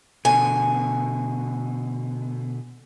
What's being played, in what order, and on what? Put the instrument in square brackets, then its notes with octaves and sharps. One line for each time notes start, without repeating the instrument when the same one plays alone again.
[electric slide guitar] B2 D3 [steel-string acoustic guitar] G#5